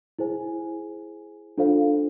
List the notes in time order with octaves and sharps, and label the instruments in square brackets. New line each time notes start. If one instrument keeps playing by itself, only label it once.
[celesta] E4 G#4 C5 G#5
D4 F4 A4 C5 F5